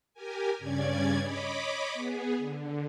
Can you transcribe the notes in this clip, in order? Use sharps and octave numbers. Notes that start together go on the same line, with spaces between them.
G4 A#4 G#5
G2 C#3 C#4 D5 G#6
C#5 D#5 B5 D6
B3 G#4
D3